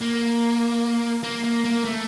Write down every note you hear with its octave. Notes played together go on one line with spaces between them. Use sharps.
A#3
A#3
A#3
A#3
A3